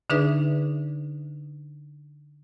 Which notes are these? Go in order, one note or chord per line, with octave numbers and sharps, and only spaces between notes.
D3 D4 D#4 G#4 B4 E5